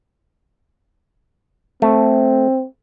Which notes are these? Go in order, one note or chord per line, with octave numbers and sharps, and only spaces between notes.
A3 C4